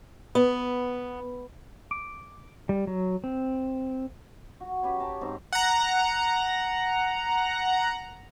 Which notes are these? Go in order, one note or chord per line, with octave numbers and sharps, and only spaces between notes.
B3
D6
G3
F#3
C4
F#4
C#4 G4 B4 C#5
G5 A5 A#5
G#2 C4 A#5
F#5 A#5